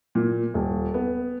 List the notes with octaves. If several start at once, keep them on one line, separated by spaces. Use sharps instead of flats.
A#2
D#1
B3